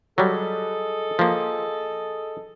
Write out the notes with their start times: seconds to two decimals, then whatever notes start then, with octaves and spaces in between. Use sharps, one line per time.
0.18 F#3 G3 G#4 A4 D#5
1.19 F3 A#3